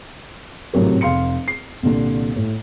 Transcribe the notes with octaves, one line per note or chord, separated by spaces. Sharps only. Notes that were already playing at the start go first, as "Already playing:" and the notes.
G#1 A2 C3 F#3 A#4
F1 F5 C6 C#7
C7
C2 A#2 D3
A2